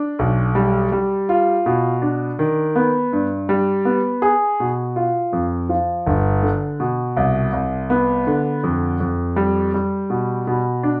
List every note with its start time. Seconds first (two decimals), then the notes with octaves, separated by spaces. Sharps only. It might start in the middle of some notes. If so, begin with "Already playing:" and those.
Already playing: D4
0.19 B1
0.55 G3
0.92 G3
1.29 F4
1.66 B2
2.02 D4
2.39 D#3
2.76 B3
3.12 G2
3.49 G3
3.85 B3
4.22 G#4
4.60 B2
4.96 F4
5.33 F2
5.69 F3
6.06 G1
6.43 D3
6.80 B2
7.16 C2
7.53 C2
7.90 B3
8.27 D3
8.63 F2
9.00 F2
9.36 G3
9.74 G3
10.10 B2
10.47 B2
10.83 D4